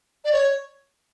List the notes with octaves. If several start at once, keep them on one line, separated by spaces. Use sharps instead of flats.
D5
C#5